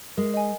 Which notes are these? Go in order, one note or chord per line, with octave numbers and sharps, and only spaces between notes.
G#3 A#4
D#5 G#5